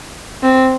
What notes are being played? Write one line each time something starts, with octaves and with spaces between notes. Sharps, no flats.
C4